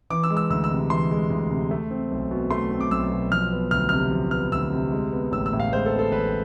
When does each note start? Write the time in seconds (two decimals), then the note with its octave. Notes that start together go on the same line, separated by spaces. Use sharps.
0.10 E3 D6
0.23 E6
0.30 G#3
0.37 E6
0.50 D2 E6
0.64 E6
0.71 C3
0.90 E3 C6
1.11 G#3
1.30 D2
1.50 C3
1.71 A3
1.91 C4
2.12 B1
2.31 B2
2.51 A3 C6
2.71 C4
2.81 D6
2.91 B1 E6
3.11 B2
3.31 F3 F6
3.52 B3
3.71 D2 F6
3.89 C3 F6
4.11 F3
4.31 B3 F6
4.52 D2 E6
4.72 C3
4.91 G#3
5.12 B3
5.32 A1 E6
5.46 E6
5.53 A2
5.60 F5
5.72 G#3 C5
5.86 A4
5.92 B3
5.99 A4
6.12 A1 B4